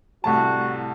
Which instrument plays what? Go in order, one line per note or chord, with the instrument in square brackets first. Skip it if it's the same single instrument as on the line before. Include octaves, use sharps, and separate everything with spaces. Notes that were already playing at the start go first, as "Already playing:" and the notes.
[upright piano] C2 A2 A5 [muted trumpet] F#4